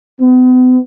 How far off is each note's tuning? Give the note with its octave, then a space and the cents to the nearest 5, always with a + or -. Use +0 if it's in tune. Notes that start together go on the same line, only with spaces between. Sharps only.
B3 +40